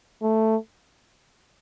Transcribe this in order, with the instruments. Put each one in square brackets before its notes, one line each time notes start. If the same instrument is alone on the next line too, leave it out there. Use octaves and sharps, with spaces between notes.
[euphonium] A3